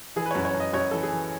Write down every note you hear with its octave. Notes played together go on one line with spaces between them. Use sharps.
E3 G#4
B4
C#5
F#2
C#5
F#2
D#5
F#2 C#5
E3 A4
G#4
E3